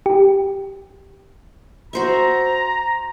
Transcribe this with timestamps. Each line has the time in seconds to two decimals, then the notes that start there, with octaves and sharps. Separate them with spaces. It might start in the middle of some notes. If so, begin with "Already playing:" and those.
0.06 G4
1.93 F#4 C5 E5 A#5